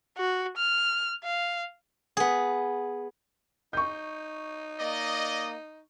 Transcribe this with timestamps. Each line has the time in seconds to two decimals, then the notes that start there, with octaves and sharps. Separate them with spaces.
0.18 F#4
0.57 F6
1.24 F5
2.17 B3 G#4
3.73 D#4 C#6 G6
4.79 A#3 D5 D#5